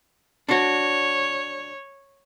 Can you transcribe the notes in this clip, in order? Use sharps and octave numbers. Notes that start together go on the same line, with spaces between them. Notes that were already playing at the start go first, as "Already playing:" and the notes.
D4 F#4 C#5